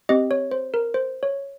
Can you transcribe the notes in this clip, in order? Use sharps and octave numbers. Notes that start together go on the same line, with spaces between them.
C4 G4 D#5
C#5
C5
A#4
C5
C#5